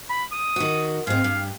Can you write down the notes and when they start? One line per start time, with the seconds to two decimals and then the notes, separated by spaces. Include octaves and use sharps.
0.10 B5
0.32 D#6
0.56 D#3 F#4
1.07 G#2 C4 F5
1.24 G2